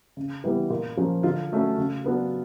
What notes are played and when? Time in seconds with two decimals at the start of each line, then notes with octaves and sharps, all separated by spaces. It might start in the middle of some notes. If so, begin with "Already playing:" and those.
0.17 C#3
0.44 E3 G3 B3
0.70 A#2
0.97 F3 A#3 C#4
1.23 D3 F4
1.51 F#3 A3 C#4
1.78 C#3
2.04 F#3 B3 D4